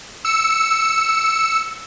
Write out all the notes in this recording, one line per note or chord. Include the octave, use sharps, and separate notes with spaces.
E6 C#7